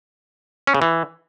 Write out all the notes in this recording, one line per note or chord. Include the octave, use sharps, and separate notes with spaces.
C#4
C#3
E3